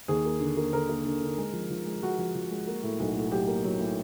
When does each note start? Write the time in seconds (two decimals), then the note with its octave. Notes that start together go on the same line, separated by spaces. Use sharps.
0.08 D#2 G#4
0.25 A#3
0.40 D3
0.57 A#3
0.73 D3 A#4
0.89 A#3
1.05 D3
1.21 D3
1.38 G#3
1.53 F3
1.70 F3
1.86 G#3
2.03 G#3 F#4
2.18 F3
2.35 F3
2.51 G#3
2.67 A#3
2.83 A2
3.00 B1
3.15 A2
3.31 F#3 G4
3.47 A#3
3.64 F#3
3.79 A2